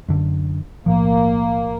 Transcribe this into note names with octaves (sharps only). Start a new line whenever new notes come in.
F#2 D3
B1 A2 F3 A#3